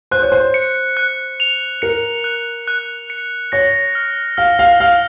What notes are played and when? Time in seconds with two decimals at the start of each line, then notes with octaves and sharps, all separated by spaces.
0.11 C5 F#6
0.22 C#5
0.32 C5
0.54 C#7
0.97 F#6
1.40 F7
1.82 A#4 C#7
2.24 F#6
2.68 F#6
3.10 C#7
3.52 C#5 A#6
3.95 F6
4.37 F5 F6
4.59 F5
4.80 F5 F6